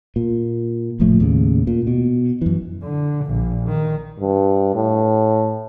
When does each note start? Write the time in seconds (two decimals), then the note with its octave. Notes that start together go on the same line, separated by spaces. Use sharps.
0.16 A#2
1.00 F#1 A2 F3 A3
1.20 D#2 A2 C#3
1.67 A#2
1.87 B2
2.42 F#2 E3
2.83 D3
3.26 A#1
3.68 D#3
4.19 G2
4.75 A2